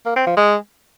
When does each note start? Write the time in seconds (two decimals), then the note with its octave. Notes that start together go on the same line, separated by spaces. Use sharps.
0.06 A#3
0.16 C4
0.26 F3
0.37 G#3